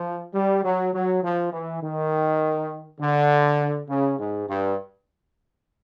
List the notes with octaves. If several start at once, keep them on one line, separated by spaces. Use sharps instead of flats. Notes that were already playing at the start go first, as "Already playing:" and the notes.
Already playing: F3
G3
F#3
F#3
F3
E3
D#3
D3
C#3
G#2
G2